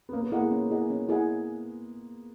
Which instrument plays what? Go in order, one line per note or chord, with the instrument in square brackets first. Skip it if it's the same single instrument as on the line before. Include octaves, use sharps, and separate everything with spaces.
[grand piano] B3
[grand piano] A#3 [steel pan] C#4
[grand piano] B3
[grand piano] A#3 [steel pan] E4 G#4 D#5 F#5
[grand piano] G#3
[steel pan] C#4
E4 G#4 D#5 F#5
C#4
E4 G#4 D#5 F#5